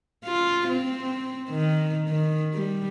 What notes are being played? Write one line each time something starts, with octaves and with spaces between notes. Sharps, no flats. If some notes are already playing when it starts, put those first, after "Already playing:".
F4
C4
D#3
D#3
G3